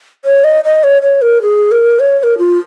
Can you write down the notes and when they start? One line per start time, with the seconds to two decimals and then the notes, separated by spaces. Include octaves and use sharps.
0.25 C#5
0.44 D#5
0.64 D#5
0.84 C#5
1.02 C#5
1.22 A#4
1.42 G#4
1.71 A#4
2.00 C#5
2.20 C#5
2.23 A#4
2.38 F4